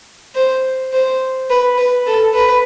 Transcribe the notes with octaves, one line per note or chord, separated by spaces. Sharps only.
C5
C5
B4
B4
A4
B4